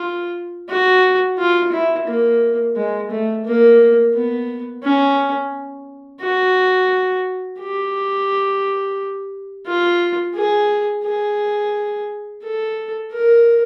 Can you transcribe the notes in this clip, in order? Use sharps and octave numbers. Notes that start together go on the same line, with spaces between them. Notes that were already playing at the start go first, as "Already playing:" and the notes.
Already playing: F4
F#4
F4
E4
A#3
G#3
A3
A#3
B3
C#4
F#4
G4
F4
G#4
G#4
A4
A#4